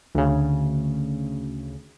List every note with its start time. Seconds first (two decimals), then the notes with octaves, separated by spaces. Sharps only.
0.15 D2 C#3